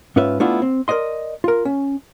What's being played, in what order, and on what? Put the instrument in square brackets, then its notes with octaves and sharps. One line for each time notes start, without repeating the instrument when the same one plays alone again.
[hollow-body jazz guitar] G#2 C#4 F4 B4 E5
A3 B3 D4 E4 F4
C4
A#4 C5 D5 D#5 C6
F4 A#4
C#4